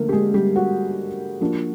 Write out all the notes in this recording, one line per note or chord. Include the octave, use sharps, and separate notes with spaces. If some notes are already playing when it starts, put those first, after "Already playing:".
Already playing: D3 F3 A3 A#3 D4 A#4
G4
G#3 G#4
G3 G4
F#4
F3 A#3 D4